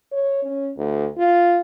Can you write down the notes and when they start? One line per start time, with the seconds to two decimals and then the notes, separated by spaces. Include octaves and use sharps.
0.12 C#5
0.43 C#4
0.77 D2
1.17 F4